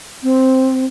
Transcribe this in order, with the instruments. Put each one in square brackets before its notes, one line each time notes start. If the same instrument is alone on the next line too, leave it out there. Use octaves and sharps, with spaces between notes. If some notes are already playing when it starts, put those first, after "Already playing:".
[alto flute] C4